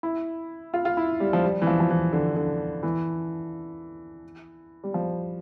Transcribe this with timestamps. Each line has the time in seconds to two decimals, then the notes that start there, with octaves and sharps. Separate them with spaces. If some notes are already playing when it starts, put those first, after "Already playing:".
0.03 E4
0.74 F4
0.85 F4
0.97 E4
1.20 G3
1.33 F3
1.44 G3
1.62 E3
1.67 F3
1.80 F3
1.90 E3
2.13 D3
2.36 D3
2.83 E3
4.84 G3
4.94 F3